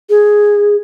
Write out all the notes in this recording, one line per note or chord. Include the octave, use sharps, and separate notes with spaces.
G#4